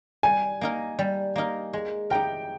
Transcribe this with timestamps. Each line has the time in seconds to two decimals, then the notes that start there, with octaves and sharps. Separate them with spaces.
0.23 G3 G#5
0.61 A#3 D#4 A#4
0.99 G3
1.36 A#3 D#4 A#4
1.73 G#3
2.10 D#4 G4 A#4 G5